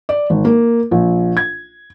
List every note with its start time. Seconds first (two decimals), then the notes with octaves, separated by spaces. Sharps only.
0.09 D5
0.30 G#1
0.45 A#3
0.91 A#1
1.37 G#6